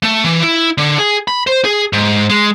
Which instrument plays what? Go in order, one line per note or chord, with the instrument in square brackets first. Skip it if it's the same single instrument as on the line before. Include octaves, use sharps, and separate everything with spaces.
[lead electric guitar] A3
E3
E4
D3
G#4
B5
C5
G#4
G#2
G#3